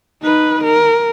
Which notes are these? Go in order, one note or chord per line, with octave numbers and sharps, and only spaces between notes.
D#4 B4
A#4